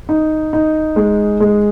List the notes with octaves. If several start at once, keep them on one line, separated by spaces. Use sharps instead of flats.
D#4
D#4
G#3
G#3